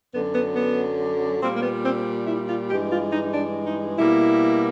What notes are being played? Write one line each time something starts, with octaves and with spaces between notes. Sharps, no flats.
F#2 D3 F#3 B3
B3
B3
A#2 G3 A#3 C4
A#3
B3
C4
E4
F4
G2 E3 G#3 G4
F4
D#4
D4
D#4
B2 G3 A#3 E4